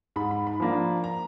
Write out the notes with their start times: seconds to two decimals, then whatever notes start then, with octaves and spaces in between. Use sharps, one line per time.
0.16 G#2 B5
0.31 B5
0.47 B5
0.60 F3 A#3 D4 B5
1.04 A#5